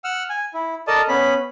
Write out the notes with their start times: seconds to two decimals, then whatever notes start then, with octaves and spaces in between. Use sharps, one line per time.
0.04 F#5 E6 F6
0.30 G#5
0.54 E4
0.88 A4 A#4 D5 D#5 A5
1.09 B3 C#4 B5